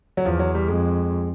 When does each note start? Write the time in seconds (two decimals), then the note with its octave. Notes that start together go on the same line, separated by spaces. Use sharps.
0.17 F#3
0.25 E2 F3
0.39 F#3
0.54 G3
0.68 F2 G#3